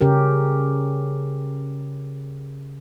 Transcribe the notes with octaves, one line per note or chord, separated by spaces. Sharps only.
C#3 C#4 G4 A#4